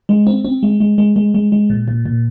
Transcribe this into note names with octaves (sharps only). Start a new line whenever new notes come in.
G#3
C4
C4
G#3
G#3
G#3
G#3
G#3
G#3
A#2
A#2
A#2